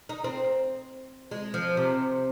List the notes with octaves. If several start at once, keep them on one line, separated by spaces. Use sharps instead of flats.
D#4
C4
G#3
F3
C3